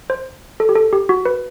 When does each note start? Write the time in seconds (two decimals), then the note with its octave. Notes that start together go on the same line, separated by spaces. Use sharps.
0.10 C5
0.60 A4
0.69 G4
0.76 A4
0.92 G4
1.09 F#4
1.25 B4